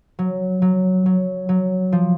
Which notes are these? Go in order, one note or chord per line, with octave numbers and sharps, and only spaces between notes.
F#3
F#3
F#3
F#3
F3